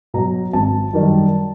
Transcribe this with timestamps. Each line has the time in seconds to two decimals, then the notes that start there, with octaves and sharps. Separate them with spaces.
0.14 B2 F#3 A#5
0.53 G#1 A5
0.93 F#2 D#3 G3